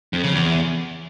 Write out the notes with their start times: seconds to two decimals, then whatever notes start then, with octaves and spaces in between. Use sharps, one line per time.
0.13 F2
0.23 C#3
0.34 E2